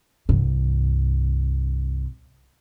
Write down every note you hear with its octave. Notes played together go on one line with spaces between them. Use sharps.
C2 G2